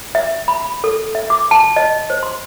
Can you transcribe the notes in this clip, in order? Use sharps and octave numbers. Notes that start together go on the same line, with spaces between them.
E5
B5
A4
E5
D6
A5
D#5
C5
C6